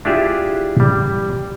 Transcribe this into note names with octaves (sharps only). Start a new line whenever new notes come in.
D4 E4 F4 G4 G#4 E5
G3